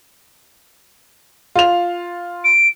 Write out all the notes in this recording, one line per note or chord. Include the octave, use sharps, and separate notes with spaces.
F4 F7
D7